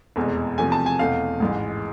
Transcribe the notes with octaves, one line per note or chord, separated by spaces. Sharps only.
F1 E2 B2 G#3
E2 C3 F3 A3 C4 G#5
A5
G#5
E2 B2 A3 C4 F5
A1 G#2 E3 G#3